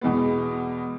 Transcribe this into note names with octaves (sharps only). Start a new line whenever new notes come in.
E2 B2 G#3 B3